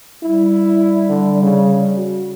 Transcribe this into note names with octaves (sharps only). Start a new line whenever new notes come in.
G3 E4
D3
C#3
F#4